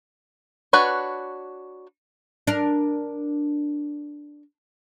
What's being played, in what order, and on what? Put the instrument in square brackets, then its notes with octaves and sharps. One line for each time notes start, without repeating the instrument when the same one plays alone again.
[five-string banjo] D4 F#4 B4 C#5
[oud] D4 A#4